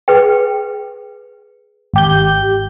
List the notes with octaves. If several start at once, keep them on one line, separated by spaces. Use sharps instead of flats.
G#4 B4 G5
G#1 G4 G6